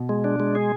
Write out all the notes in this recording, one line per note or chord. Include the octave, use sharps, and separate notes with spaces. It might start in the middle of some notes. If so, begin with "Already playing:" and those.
Already playing: B2
G#3
D4
G#3
G#4